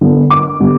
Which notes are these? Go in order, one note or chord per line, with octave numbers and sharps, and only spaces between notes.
D3 B3 D4
D6
D3 G3 B3 D4